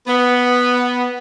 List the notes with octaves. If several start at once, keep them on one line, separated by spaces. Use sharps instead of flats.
B3